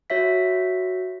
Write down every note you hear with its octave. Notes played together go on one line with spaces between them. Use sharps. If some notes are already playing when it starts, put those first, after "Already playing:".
F#4 C#5 E5 B6